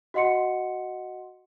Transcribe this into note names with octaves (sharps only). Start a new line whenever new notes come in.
F#4 D#5 F#5 C6 C#7